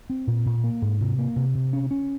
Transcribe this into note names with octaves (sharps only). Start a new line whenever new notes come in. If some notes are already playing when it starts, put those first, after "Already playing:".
C4
A#2
A#2
A#3
G#2
C3
A#3
C3
C3
C#4
C#4